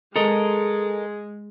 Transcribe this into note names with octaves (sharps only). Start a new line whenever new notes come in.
G#3 A4 A#4 D#5